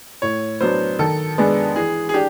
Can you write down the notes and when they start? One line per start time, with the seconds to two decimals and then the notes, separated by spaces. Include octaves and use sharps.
0.22 A2 C#5
0.61 F#3 B3 D4 C5
0.99 D#3 A4
1.38 G#3 B3 D4
1.76 E3 G#4
2.09 G#4
2.14 D4 G4